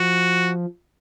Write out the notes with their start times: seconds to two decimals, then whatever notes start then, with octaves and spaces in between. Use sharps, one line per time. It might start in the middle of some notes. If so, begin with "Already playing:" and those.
Already playing: F3 F#4